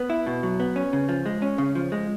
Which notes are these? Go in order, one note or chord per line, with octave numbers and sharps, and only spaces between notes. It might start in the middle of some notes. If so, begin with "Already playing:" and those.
Already playing: B3
E4
B2
F#3
B3
C#4
C#3
F3
G#3
C#4
C#3
F3
G#3